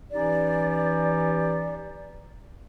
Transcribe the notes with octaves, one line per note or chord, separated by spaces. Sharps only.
E3 C#4 D#4 G4 D5